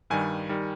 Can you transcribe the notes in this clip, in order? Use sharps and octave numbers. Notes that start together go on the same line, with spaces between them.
G2 D#3 G3 G#5
D#3 G3